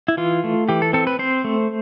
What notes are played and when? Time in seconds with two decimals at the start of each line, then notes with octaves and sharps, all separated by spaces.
0.08 E4
0.17 E3 F4
0.44 A3
0.69 E3 G4
0.82 A4
0.93 C4 A4
1.07 B4
1.19 C4 C5
1.44 A3